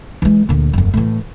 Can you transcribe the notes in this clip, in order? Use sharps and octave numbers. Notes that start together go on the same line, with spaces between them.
E3 G#3
D2 A#2
F#1 F2
A2 E3